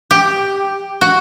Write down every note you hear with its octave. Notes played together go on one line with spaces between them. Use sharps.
G4
F#4